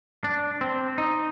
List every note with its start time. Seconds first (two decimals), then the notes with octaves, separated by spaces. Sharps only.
0.24 D4
0.61 C4
0.98 D#4